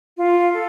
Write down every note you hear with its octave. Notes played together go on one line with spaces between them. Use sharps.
F4
A4